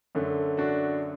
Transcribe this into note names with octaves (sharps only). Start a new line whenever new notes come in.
F#2 D3 A3
D4 F#4